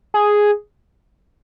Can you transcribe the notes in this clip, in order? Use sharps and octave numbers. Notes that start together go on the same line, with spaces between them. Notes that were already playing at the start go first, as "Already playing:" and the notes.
G#4